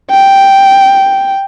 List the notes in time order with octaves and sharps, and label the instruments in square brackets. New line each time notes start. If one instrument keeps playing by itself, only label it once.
[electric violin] G5